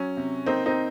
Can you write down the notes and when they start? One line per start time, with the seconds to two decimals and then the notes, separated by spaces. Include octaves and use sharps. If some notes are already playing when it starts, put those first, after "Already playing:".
Already playing: F#3 C#4
0.17 C3
0.46 A#3 C4 D#4
0.66 C4 D#4